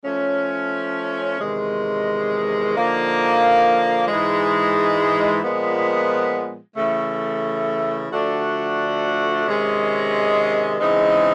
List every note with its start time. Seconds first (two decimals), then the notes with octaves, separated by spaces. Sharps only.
0.04 F3 A3 C#4
1.39 E2 C3 D#3 G#3
2.74 D3 F3 A#3 D#4
4.07 G#2 E3 G#3
5.42 A#2 F3 G#3 B3
6.77 C#3 E3 A3
8.11 D3 F3 A3 D4 F#4
9.46 C3 D#3 G#3 C#4
10.80 C#3 E3 G#3 C4 D#4